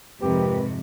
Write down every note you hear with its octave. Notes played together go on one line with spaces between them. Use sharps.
F2 G#2 C3 C4 G4 A#4 B4